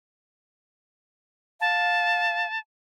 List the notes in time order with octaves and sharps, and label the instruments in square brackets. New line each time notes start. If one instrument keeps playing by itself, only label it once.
[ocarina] F5 [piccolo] A5